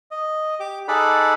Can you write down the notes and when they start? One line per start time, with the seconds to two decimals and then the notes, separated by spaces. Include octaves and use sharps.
0.11 D#5
0.60 G4 D6
0.88 D#4 G#4 A4 D5 F#5 B5